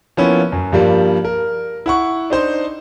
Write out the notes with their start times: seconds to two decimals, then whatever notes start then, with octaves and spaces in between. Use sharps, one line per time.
0.17 F3 A#3 B3 C#4 E4
0.52 F#2
0.72 G2 F3 G3 A#3
1.25 A#4
1.86 E4 F#5 C#6
2.30 D4 D#4 C5 C6